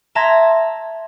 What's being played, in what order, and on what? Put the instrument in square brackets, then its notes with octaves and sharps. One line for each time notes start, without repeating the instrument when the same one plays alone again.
[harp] E5 A5 A#5 C6 G#6 A#6